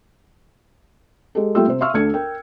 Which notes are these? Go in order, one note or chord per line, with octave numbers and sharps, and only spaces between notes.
G#3 G4 A4
G3 A3 A#3 F4 G5 E6
C3 C5
E5 F5 C6 C#6 E6 F6
D2 D4 A4 G#6 C#7
A#4 G5